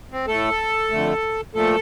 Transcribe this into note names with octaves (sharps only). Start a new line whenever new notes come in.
C4
A2 A3 A4
F2 D3 A3
A#2 F3 A3 A4